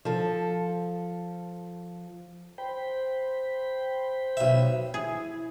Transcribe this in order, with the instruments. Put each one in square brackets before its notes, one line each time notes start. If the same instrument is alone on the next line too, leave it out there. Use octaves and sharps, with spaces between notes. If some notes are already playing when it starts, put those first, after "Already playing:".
[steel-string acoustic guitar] F3 A4
[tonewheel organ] C5 G5 B5
[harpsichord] B1 E5
[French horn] E4 [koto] G#4